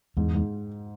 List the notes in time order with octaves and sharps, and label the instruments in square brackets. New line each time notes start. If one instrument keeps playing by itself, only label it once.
[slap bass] E2 [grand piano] G#2
[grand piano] G#2